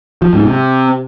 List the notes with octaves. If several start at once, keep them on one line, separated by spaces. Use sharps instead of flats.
F3
G#2
C3